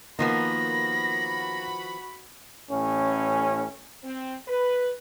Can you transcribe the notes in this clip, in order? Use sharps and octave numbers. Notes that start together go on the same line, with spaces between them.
D#3 F3 A#3 B3 F#4 B5 A#6
A1 A2 C#4
C4
B4